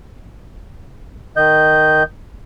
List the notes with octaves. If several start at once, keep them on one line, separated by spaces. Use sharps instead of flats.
D#3 D#5 G6